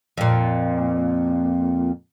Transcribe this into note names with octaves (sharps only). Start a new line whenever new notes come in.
F2 A#2